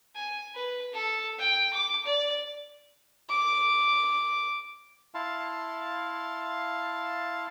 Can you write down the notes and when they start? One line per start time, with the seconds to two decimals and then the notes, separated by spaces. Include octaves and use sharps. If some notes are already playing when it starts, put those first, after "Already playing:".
0.15 G#5
0.54 B4
0.92 A4
1.38 G5
1.73 D6
2.05 D5
3.30 D6
5.15 E4 F5 A5 C6